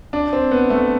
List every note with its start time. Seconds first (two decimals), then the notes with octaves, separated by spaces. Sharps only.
0.13 D4
0.33 C4
0.51 B3
0.70 A3